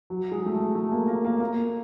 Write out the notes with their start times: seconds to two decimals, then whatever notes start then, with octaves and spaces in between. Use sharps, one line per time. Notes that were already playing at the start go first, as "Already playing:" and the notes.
0.10 F#3
0.32 G#3
0.46 A3
0.54 G#3
0.75 A3
0.92 A#3
1.08 A#3
1.25 A#3
1.40 A#3